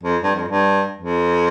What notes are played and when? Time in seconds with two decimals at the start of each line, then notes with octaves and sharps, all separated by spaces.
0.03 F2
0.22 G2
0.35 F2
0.48 G2
0.97 F2